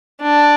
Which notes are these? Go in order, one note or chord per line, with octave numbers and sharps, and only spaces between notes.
D4